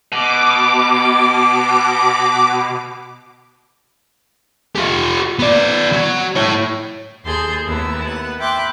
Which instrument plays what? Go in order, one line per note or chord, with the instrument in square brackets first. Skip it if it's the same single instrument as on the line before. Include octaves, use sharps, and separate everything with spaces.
[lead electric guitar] B2 [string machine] D6
[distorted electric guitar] F4 G4
B3 D5
F#3
E4 C#5
[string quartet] D#2 G#4 A4 C6 G6
D#2 A3 B3 E4 E6
B3 F#5
E5 G5 B5 C6 D6 F#6